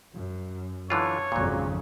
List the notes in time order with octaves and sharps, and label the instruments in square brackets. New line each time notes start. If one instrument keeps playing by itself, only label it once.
[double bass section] F#2
[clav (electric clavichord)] D3 E3 F4 [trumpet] C#5
[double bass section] G#1 F2 C#3 [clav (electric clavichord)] A#2 F#3